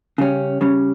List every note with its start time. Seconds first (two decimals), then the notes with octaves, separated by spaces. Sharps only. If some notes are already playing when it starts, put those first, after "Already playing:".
0.18 C#3 G3 C#4
0.61 C#3 G3 C#4